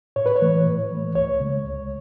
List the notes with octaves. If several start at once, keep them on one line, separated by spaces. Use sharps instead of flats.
A2 C#5
B4
C#5
E3 A3
A2
E3 A3
C#2 C#5
C#3 G#3
C#2